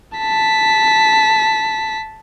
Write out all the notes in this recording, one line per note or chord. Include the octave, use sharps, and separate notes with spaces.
A5 B6